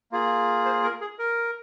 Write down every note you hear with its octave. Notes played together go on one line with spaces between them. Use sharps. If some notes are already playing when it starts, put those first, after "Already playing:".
A#3 F4 G#4
C5
A#4
G#4
A#4